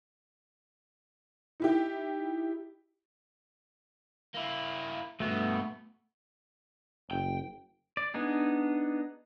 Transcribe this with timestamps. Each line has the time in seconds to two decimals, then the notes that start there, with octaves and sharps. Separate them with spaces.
1.60 D#4 E4 G4
4.34 A#3 E4
5.20 G2 B2 A3 B3
7.11 F#1 G5
7.97 D5
8.14 B3 D4 D#4 G#4